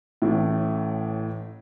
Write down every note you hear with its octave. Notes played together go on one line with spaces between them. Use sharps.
A1 A2